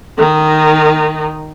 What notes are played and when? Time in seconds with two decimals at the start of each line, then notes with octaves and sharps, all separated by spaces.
0.18 D#3 D#4